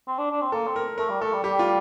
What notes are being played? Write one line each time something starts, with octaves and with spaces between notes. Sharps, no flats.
C4
D4
D4
C4
A#3 A4
C4
A#4
A3 A#4
G3
A3 A4
G3
G3 G4
F4